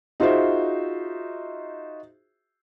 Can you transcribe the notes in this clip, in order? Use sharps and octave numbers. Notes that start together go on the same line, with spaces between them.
D#4 F4 F#4 G#4 C5 E5